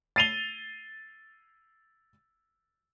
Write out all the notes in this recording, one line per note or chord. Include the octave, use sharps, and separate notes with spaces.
A6 C7 D#7 F7 G7